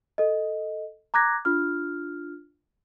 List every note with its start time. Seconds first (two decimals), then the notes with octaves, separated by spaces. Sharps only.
0.18 A4 D#5
1.14 A#5 D6 F#6 G#6 A#6
1.45 D4 F4 F6